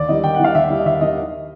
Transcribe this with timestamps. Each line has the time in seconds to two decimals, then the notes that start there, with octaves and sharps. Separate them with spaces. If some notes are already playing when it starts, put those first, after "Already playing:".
Already playing: D#2 D5
0.08 D#3 G3 D#5
0.24 D#2 G5
0.34 F#5
0.40 D#3 G3 F5
0.55 D#2 E5
0.70 D#3 G3
0.78 D#5
0.85 D#2 E5
1.01 D#3 G3 D#5